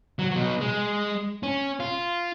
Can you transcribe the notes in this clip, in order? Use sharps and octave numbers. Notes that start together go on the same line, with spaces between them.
F#3
B2 F#3
G#3
C#4
F4